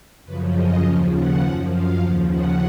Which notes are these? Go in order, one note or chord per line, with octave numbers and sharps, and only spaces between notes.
F#2 C#3 F3 B4
D#5
D#2 C#3 F3 F5
F#5
F#2 F3 F#5
F5
D#2 C#3 F3 F#5
F#5